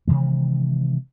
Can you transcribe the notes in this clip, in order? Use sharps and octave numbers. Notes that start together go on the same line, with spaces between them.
C3 D#3 E3 G#3